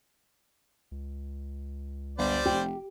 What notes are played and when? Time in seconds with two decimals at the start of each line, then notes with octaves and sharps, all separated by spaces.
0.92 C#2
2.19 G1 G3 C5 D5
2.46 F1 G4